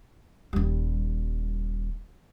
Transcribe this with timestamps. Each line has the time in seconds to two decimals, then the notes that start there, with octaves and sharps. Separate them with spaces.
0.53 D#1 G3